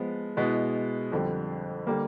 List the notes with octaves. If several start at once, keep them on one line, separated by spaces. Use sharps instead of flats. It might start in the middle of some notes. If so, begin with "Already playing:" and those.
Already playing: F3 G#3 B3
B2 G#3 B3 E4
F2 D3 G3
D3 G3 A#3